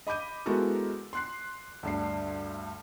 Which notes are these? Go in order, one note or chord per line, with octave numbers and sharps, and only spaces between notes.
D#5 B5 D6 G6 D#7
G#3 B3 E4 F#4 A4 A#4
C6 F#6 C7
D2 G2 C7